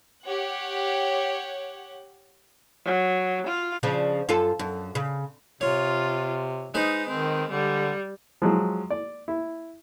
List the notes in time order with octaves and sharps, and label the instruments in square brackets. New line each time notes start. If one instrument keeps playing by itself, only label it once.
[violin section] G4 C#5 F#5
[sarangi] F#3
F4
[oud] C#3 F3 D4
F#2 F4 A4
F#2
C#3
[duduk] C3 [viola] F4 [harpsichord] C#5
[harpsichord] G#3 B4 C5 [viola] D#4
[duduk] D#3 [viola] C4
[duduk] D3 [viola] G3
[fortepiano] F3 F#3 G#3
D5
E4